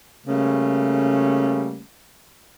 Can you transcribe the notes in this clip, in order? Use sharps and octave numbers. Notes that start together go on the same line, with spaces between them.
C#3 G3 A3 A#3 C#4